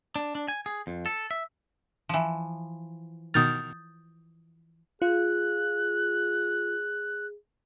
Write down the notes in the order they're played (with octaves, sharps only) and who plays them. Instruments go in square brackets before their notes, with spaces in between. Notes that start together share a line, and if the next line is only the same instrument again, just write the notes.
[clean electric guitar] D4
D4
G#5
G#4
F2
A4
E5
[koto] E3 F3
[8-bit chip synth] B2 D#3 F6 [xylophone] D#6 G6 A6
[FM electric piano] F4 [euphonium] G#4 [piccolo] F#6